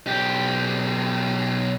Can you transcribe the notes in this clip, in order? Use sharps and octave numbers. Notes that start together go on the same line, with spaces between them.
B1 G4